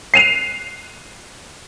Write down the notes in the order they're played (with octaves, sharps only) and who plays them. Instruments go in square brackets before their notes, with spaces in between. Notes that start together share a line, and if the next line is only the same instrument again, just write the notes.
[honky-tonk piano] C7 D#7 F7